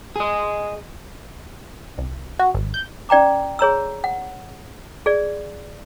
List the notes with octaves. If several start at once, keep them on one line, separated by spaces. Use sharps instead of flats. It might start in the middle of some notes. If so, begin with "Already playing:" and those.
G#4 D#5
C2
F#4
G#1
G6
C#4 D5 G5 A#5 D6
G#4 C#5 A#5 E6
F#5
G#4 D5